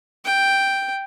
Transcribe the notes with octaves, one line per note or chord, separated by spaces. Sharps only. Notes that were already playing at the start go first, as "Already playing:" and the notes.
G5